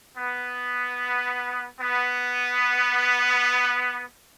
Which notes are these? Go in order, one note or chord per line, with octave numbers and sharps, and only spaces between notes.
B3
B3